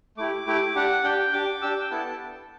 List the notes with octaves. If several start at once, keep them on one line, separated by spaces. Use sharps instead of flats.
A3 E4 G4 D6
A3 E4 G4
D4 G4 F#5
D4 G4 G5
D4 G4 D6
D4 G4 E6
D6
G5
B3 E4 A4 A5